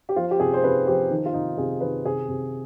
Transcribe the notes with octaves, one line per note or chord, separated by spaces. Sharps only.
G4
F3 F4
G4
C3 G#4
C5
C3 B4
F3 G4
D#3
F4
C3 D#4
C3 G#4
D#3 B4
C3 G#4
C3